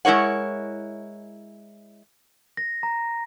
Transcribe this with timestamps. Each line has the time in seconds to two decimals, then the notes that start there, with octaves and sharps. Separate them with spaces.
0.05 G#3 E4 A#4 C#5 F#5
2.57 A#6
2.83 A#5